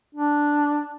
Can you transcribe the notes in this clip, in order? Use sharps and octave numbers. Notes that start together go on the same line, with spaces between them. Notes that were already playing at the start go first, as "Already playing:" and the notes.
D4